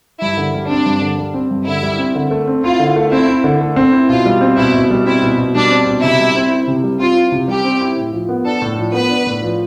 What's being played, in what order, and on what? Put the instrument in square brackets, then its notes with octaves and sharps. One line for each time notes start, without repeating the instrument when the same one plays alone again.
[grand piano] G2 [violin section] E4
[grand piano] D3
G3
[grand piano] C4 [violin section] D4
[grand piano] G2
D3
G3
C4
G2
[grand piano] D3 [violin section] E4
[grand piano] G3
C4
D3
A3
C4
[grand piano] E4 [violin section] F4
[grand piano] D3
A3
[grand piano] C4 [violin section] E4
[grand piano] E4
D3
A3
C4
E4
[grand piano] B2 [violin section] F4
[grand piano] G3
C4
[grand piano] B2 [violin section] E4
[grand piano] B2
G3
[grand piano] C4 [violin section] E4
[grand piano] B2
B2
[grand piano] G3 [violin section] D4
[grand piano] C4
B2
[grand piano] C3 [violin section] E4
[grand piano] G3
C4
E4
C3
G3
[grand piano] C4 [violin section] F4
[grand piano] E4
C3
[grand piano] G3 [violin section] G4
[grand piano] C4
E4
A2
F3
B3
[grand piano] D4 [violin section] A4
[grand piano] A2
F3
[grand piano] B3 [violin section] B4
[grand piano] D4
A2
F3